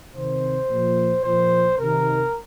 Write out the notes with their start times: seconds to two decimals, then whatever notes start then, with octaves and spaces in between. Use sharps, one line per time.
0.14 C3 D#3 C5
0.69 A#2 F3
1.24 A#2 F3 C5
1.79 C3 D#3 A#4